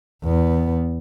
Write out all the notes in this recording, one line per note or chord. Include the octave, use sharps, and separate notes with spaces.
E2 B3